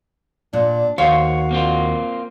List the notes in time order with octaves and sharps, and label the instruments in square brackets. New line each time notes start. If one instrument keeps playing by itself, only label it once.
[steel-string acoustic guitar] A#2 [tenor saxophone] D4
[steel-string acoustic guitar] D#2 [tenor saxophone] F#4 [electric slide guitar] C5 C#5 [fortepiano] F5
[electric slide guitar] A#3 C4 F4